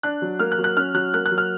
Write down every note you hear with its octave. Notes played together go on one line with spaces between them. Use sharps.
D4 F#6
F#3
A#3 F6
F#6
F#3
F#6
C#4 F6
F#3 F#6
A#3 F#6
F#6
F#3
F6